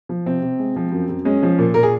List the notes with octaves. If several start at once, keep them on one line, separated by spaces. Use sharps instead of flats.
F3
C3 C4
C3
G#3
F3
F#2
F#2
G#3 C#4
F3
A#2
A#2 A#4
G#4